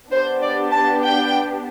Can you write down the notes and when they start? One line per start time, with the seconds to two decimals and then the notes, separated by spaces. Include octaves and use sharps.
0.10 B3 D4 G4 C5
0.41 D5
0.71 A5
1.02 G5